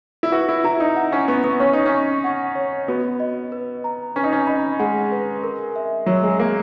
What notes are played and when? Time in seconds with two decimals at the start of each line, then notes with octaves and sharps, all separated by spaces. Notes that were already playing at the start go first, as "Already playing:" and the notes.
0.23 E4
0.32 F#4 B4
0.49 E4
0.64 E4 A#5
0.80 D#4
0.96 F#5
1.12 C#4
1.28 B3 C#6
1.44 B3
1.60 C#4 C#5
1.73 D#4
1.86 C#4
1.92 C#6
2.24 F#5
2.55 C#5
2.88 B3 F#4
3.20 D#5
3.52 B4
3.84 A#5
4.16 C#4 B4
4.24 D#4
4.33 C#4
4.47 D#4 B5
4.79 G#3 F#5
5.12 B4
5.44 A#4
5.76 E5
6.06 F#3 C#5
6.24 G#3
6.39 A#3 A#4